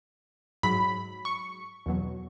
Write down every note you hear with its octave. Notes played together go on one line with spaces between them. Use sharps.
G#2 F#3 B5
C#6
E2 B2 F#3